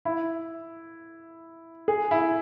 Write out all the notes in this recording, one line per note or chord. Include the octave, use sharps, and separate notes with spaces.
E4
G#4
E4